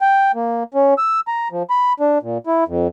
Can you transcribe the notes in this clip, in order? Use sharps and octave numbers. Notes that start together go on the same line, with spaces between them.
G5
A#3
C#4
E6
A#5
F3
B5
D4
A#2
E4
F2